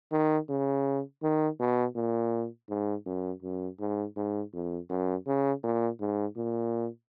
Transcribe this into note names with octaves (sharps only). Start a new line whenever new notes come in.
D#3
C#3
D#3
B2
A#2
G#2
F#2
F#2
G#2
G#2
F2
F#2
C#3
A#2
G#2
A#2